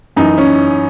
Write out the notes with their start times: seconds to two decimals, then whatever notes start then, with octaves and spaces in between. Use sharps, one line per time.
0.16 F#2 E3 D#4
0.38 C#4